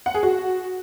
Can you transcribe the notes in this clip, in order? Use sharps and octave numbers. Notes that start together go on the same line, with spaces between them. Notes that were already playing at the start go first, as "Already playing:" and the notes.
F#5
G#4
F#4